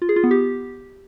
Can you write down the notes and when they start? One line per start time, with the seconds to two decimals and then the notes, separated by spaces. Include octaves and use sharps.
0.02 F4
0.09 G#4
0.16 F4
0.24 B3
0.31 G4